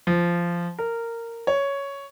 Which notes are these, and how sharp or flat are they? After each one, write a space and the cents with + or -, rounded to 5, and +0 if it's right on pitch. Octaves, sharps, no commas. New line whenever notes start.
F3 -15
A#4 -15
C#5 +5